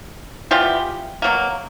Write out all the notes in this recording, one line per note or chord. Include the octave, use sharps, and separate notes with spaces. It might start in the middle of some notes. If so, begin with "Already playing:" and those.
E3 G3 B3 F4 G4
B2 F#3 A#3